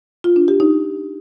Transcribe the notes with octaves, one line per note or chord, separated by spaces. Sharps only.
F4
D4
G4
D#4